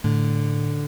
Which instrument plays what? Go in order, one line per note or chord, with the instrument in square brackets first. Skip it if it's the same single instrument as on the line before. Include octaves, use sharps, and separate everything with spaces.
[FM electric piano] A2 [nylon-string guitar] D3